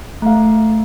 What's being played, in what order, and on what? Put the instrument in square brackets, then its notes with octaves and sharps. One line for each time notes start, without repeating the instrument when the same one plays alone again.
[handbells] A3 F5